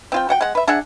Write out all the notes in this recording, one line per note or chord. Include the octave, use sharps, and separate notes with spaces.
C4 F4 G5
F#4 F#5 G5
G#3 F#5
B4 E5
D4 G#4 E5 F#5